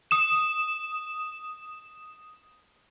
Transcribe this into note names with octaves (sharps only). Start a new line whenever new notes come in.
D#6 E7